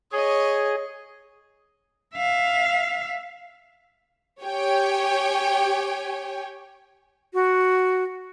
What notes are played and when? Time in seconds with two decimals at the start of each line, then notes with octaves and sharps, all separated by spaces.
0.12 G#4 C#5 D#5
2.15 E5 F5
4.42 G4 C#5 G5 G#5
7.34 F#4